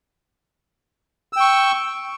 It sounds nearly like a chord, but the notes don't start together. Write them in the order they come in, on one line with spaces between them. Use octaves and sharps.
E6 G5 C#6